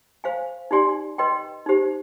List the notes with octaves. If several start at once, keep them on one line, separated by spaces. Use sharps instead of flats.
C5 F5 G#5
D#4 G4 D5 G#5 C6
B4 D#5 G5 C6
D#4 G4 C5